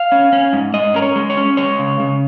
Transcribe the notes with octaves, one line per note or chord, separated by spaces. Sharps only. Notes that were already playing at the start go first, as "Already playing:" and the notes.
Already playing: F5
C#4
C#4
G#2
G#2 D#5
C#4 A#4
C#5
G#3
C#5
C#4
G#3 C#5
C#3
C#3